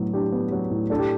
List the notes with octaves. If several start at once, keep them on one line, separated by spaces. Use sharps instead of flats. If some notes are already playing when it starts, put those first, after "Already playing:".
Already playing: A2 F#3 B3
D4 G4
B3
F#3
A2
D4 A4
G4